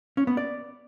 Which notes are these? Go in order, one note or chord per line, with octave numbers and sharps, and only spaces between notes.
C#4
B3
D5